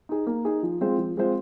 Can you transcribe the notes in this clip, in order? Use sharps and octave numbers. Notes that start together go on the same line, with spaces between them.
D#4 G#4
A#3
D#4 G#4
F3
G#3 C4 F4 C5
F3
G#3 C4 F4 C5